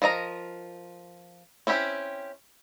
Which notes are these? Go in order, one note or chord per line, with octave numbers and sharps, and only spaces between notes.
F3 A#4 D#5 A#5
C4 C#4 E4 G4